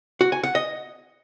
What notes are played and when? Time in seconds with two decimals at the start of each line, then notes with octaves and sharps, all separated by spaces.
0.21 F#4
0.32 G#5
0.43 F#5
0.55 D#5